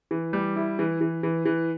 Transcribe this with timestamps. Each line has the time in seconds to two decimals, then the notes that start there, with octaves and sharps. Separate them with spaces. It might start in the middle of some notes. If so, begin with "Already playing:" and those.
0.11 E3
0.33 G3
0.56 E4
0.79 E3
1.01 E3
1.23 E3
1.45 E3